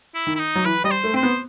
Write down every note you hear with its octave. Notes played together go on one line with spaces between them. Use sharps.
E4
D#3
E4
D#4
F#3
E3 B4
G3 D#5
C5
A3
C4 C5
B3